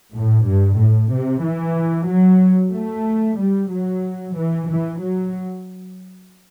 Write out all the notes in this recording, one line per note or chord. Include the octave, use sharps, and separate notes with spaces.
A2
G2
A2
C3
E3
F#3
A3
G3
F#3
E3
E3
F#3